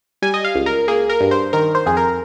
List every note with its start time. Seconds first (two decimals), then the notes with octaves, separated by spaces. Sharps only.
0.22 G3 G#5
0.34 D#5
0.45 F5
0.55 C#2
0.66 A#4
0.88 A#3 G#4
1.10 A#4
1.21 G2
1.31 C5
1.53 D#3 A#4
1.75 C5
1.86 F2 G#4
1.97 A#4